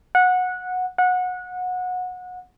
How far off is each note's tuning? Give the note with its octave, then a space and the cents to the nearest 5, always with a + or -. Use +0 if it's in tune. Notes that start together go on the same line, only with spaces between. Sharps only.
F#5 -15
F#5 -25